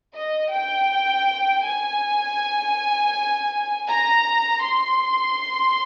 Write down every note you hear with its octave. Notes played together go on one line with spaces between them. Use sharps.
D#5
G5
G#5
A#5
C6